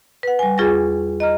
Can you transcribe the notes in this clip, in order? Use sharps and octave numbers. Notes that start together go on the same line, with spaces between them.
B4 F#5
G3 G#5
E2 F4 G#4 C#6 A6 A#6
D#5 A#5 F6